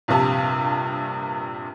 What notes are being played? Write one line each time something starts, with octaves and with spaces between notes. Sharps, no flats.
A#1 G2 C3 A5